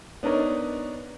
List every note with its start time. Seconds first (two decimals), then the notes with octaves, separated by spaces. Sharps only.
0.23 B3 D4 D#4 A#4 C#5